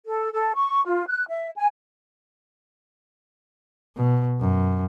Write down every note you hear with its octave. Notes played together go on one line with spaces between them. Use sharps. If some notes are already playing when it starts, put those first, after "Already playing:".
A4
A4
C#6
F4
F#6
E5
G#5
B2
F#2